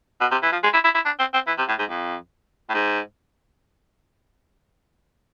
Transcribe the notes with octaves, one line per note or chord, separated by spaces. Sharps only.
B2
C3
E3
F3
G#3
E4
E4
E4
D4
C4
C4
E3
C3
A2
G#2
F2
A2
G#2